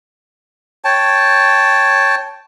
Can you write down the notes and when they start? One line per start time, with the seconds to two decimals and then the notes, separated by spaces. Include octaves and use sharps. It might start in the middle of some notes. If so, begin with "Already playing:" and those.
0.85 C#5 G5 A5